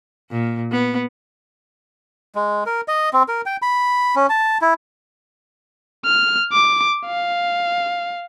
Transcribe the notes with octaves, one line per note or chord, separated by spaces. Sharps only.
A#2
B3
G#3
A#4
D#5
C4
A#4
G5
B5
C#4
A5
E4
F6
D6
F5